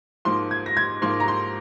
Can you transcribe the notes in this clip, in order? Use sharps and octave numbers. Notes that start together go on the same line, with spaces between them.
G#2 F3 A#3 C6
G#6
A#6
G#6
G#2 F3 A#3 C6
A#5
C6